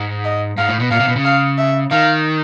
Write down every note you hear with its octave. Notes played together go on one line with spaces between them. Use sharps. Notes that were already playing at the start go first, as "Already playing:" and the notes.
Already playing: G#2
D#5
G#2 F5
A2
B2
A#2 F5
C3
B2
C#3
F5
E5
D#3 F5